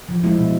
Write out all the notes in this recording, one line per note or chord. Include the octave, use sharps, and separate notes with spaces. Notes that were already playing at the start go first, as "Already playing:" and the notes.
F3
G#3 E4
B2